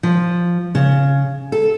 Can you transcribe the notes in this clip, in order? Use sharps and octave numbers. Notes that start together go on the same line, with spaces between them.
F3
C#3
A4